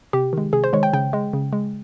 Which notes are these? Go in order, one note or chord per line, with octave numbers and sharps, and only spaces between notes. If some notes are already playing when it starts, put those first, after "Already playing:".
C3 G4
D#3 G#3
C3 G#4
C5
D#3 G#3 C#5
G5
C#3 G5
G#3
C#3
G#3